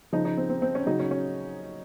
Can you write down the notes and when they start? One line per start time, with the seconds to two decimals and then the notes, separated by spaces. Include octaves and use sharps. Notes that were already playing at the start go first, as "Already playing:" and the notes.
0.13 C#3 F3 D#4
0.25 D#4
0.37 C4
0.50 C4
0.62 C4
0.75 C#4
0.87 C#3 F#3 D#4
0.99 C#4
1.11 C#4